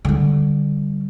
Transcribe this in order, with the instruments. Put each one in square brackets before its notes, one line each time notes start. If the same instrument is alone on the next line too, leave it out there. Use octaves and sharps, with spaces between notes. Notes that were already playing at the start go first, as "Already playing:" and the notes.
[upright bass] D3 G3